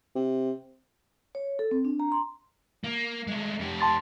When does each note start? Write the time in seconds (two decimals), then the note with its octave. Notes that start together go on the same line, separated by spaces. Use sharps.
0.15 C3
1.35 C#5
1.59 A4
1.71 C4
1.85 D4
2.00 A#5
2.12 C6
2.84 A#3
3.28 G#3 A3
3.60 F2 G4
3.81 A5 C6 A6